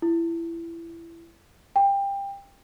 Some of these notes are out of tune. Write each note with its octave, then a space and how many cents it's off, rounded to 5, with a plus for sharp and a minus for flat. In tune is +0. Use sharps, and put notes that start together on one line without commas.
E4 +20
G5 +20